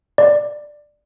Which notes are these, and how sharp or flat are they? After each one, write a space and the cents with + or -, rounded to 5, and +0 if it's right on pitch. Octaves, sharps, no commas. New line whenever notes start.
D5 +10